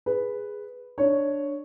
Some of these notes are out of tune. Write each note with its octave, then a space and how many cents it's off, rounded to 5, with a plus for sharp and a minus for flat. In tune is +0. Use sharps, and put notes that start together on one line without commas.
G#4 +0 B4 +0
D4 +0 C#5 +0